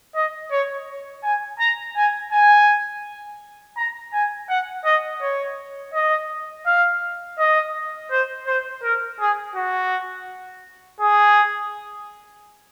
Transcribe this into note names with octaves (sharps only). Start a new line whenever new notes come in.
D#5
C#5
G#5
A#5
G#5
G#5
A#5
G#5
F#5
D#5
C#5
D#5
F5
D#5
C5
C5
A#4
G#4
F#4
G#4